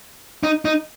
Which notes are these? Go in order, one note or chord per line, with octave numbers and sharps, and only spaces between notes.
D#4
D#4